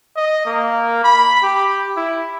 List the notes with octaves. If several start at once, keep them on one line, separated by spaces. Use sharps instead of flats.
D#5
A#3
B5
G4
E4